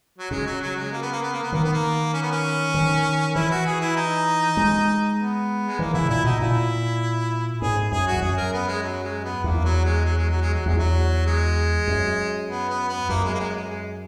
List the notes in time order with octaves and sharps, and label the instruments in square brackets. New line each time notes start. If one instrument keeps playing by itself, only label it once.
[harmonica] F#3
[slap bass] C#3 [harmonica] G#3
[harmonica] F#3
F#3
G#3
A#3
B3
A#3
B3
A#3
B3
[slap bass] D#3 [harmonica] A#3
[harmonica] B3
A#3
C#4
B3
C#4
[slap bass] D#3
[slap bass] E3 [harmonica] E4
[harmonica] F#4
G#4
E4
D#4
[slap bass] G#3
[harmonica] B3
G#3
[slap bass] E3 [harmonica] A#3
[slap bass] C#3 [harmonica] E4
[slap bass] A#2 [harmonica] E4
[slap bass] B2 [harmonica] D#4
[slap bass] A#2 [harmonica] E4
[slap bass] G#2 [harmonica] G#4
[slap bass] F#2 [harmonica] G#4
[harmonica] F#4
[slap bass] E2
[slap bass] F#2 [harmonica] G#4
[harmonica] A#4
B3
G#3
F#3
G#3
B3
[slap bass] E2 [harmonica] A#3
[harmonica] F#3
G#3
F#3
G#3
F#3
G#3
F#3
[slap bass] E2 [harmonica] G#3
[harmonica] F#3
G#3
[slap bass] F#2
[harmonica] B3
B3
B3
[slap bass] F#2 [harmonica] A#3
[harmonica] G#3
A#3
G#3
G#3
G#3